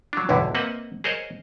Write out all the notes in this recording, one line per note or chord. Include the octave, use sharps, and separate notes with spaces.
F#3 D4
B1 E2 G2 D3 E4
A#3 C4 B4 D#5 E5 F#5
G#4 A#4 C5 C#5 D#5